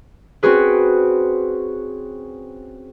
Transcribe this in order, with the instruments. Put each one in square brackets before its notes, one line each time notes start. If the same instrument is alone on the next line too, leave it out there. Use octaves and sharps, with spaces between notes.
[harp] C4 C#4 F#4 G#4 B4